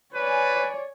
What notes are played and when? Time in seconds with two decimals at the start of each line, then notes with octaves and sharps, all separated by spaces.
0.14 B4 C#5 D5 G#5